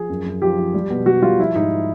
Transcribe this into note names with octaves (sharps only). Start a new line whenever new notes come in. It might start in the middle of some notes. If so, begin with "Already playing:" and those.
Already playing: F3 G#4
F#2
F#2
F3 G4
F3
G3
B2
G3 F#4
G3 F4
F3 E4
G#2 D#4